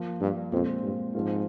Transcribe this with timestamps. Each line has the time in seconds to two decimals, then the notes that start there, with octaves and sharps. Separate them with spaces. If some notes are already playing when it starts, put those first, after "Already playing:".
Already playing: F3 A#3 F4
0.21 G2
0.52 F2 A#2 G#3 C4 F4
0.83 G2
1.14 G#2 F3 C4 F4